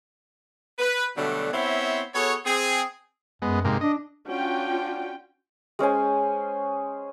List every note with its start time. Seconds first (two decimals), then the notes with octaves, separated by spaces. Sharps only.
0.79 B4
1.17 B2 D3 F#3 G3 A3
1.53 B3 C4 E4 C5 C#5 E5
2.15 B3 F#4 G#4 A4 C#5
2.46 C4 G#4
3.42 F#2 G#3 B3
3.65 G#2 C3 A#3
3.81 D4 D#5
4.27 C#4 D4 F4 F#4 G5
5.79 G#3 C#4 C5 G#5